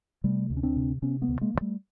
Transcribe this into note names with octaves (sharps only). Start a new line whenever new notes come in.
C3 G3 A3
D2
C#4
C4 D4
C3
C3 B3 C#4
A3 B3
D2
G#3 A#3
D2
G3 A3